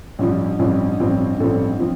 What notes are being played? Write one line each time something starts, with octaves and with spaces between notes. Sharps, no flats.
A1 G2 F3
A1 G2 F3 C4
A1 G2 F3 C4
A1 G2 F3 C4 A4
F3 C4